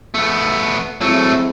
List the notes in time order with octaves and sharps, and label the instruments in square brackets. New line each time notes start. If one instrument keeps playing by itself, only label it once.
[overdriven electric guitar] A3 B3
[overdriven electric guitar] F#3 A3 [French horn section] G#3 C4 E4